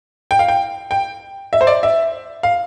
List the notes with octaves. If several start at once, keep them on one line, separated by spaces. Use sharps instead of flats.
G5
F5
G5
G5
E5
C5
D5
E5
F5